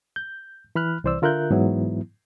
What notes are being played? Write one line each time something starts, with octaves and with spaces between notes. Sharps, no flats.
G6
E3 B5 F6 F#6
C2 E3 C5 D5 E6
D3 F4 A#4 E5 F#6 G6
G#2 E3 F#3 B3 E4